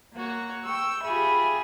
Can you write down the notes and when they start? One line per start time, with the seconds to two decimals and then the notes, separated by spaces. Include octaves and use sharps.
0.14 A#3 F#4 C#5
0.66 G5 C#6 E6
1.03 F4 G4 G#4 E5 B5